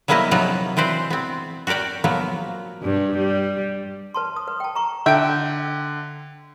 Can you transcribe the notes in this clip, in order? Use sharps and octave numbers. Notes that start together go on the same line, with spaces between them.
F#3 G3 A#3 B3 E4 D#5
C3 F3 F#3 B3 D#4
E3 C4 B4 C5 D5
B3 C4
F#4 G4 A#4 D5 G5
F3 F#3 A#3 B3
G2
G3
B4 A5 C6
D#6
B4
G5 A5
A#5 C#6
D3 E5 G5 D7